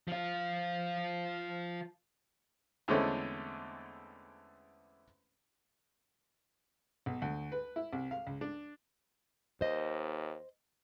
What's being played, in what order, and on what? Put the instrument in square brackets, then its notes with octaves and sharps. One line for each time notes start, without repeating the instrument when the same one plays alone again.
[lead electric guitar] F3 F4
[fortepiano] E2 D3 G#3 A3 C4 C#4
B1
D2
B4
E4
C2
F5
C#2
D4
[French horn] D#2 [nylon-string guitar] C5 D#5